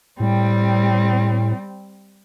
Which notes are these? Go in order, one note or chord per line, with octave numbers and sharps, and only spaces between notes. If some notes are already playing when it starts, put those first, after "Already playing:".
A2 G3 C4